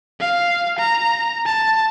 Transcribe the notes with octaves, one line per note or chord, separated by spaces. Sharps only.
F5
A#5
A5